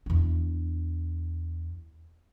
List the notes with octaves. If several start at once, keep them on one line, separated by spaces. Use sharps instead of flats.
E2 D4